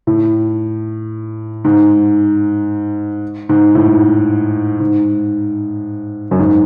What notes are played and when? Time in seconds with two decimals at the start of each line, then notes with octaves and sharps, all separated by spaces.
0.07 A2
1.65 G#2
3.49 G#2
3.75 A2
4.80 G#2
6.31 F#2
6.39 G#2